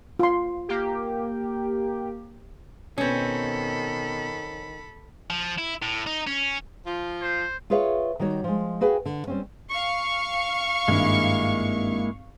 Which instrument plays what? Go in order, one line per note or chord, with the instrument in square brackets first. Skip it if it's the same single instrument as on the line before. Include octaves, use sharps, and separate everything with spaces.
[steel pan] F4 C6
[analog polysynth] A#3 G4
[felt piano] B2 B4 [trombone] D#3 [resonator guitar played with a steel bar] C4 C#4 [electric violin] A4 B5
[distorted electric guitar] F3
E4
A2
D#4
C#4
[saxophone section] F3 F4
[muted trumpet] C5
[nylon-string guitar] F4 G#4 B4 C#5 E5 F5
D#3 G3 F#4 C#5
F3 G#3
F#4 G#4 B4 F5 G5 G#5
D3
G3 C4 C#4
[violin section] F5 C#6
[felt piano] G#1 G2 [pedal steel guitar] G#3 A#3 E4